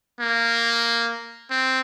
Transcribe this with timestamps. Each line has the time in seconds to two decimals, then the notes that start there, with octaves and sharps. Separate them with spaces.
0.20 A#3
1.50 C4